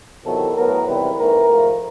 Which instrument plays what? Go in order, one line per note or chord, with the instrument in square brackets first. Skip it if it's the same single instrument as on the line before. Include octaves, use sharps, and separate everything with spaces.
[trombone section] E2 C3 D#3 F#3 B3 A4
A2 F#3 B3 A#4
E2 C3 D#3 G3 C4 B4
G#1 G#2 E3 A3 A#4
G#2 F3 A3